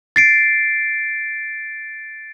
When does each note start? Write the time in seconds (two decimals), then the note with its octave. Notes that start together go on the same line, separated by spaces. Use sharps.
0.16 A6 C7 D7